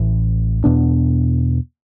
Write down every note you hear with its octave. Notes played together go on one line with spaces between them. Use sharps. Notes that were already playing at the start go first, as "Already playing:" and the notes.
Already playing: A1 A2 E3
E2 B2 B3 D4